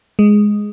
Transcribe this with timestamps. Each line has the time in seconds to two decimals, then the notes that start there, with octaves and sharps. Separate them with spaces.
0.19 G#3